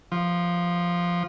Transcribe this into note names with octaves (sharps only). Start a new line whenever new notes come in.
F3